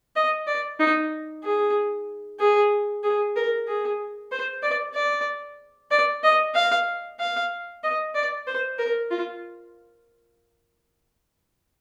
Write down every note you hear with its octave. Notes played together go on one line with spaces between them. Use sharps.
D#5
D5
D#4
G#4
G#4
G#4
A#4
G#4
C5
D5
D5
D5
D#5
F5
F5
D#5
D5
C5
A#4
F4